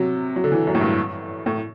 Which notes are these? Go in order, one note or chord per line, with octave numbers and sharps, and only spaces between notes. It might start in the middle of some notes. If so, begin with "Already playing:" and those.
Already playing: C3 F#3
F#3
D3
E3
F#2
A2
G2
A2